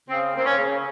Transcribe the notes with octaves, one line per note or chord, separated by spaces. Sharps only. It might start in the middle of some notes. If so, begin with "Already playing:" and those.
C#3 C4
A#3 C4
C#4
C#3